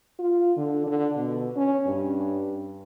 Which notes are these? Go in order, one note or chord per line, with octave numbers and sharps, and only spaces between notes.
F4
D3
D3
B2
C#4
G2